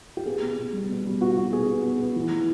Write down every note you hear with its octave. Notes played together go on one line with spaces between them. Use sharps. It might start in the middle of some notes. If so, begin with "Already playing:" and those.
G4
B3 G#4
B2
B2
G3
B2
G3
B2 F#4
B2 F#4
B3 G#4
B3
B2
B3
E3
E3